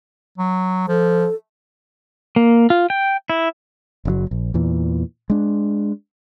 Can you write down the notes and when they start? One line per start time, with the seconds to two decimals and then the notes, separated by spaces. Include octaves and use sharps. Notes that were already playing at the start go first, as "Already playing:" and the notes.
0.38 F#3
0.88 F3 A4
2.36 A#3
2.70 F4
2.90 G5
3.30 E4
4.05 F#1 C#3 F#3
4.31 A#1
4.54 E2 A#2 E3
5.30 G#3 D4